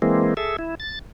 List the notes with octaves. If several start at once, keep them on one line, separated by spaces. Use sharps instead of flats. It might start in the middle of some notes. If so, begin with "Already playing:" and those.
E3 G#3 A#3 C4
G#4 A4 E5
E4
A6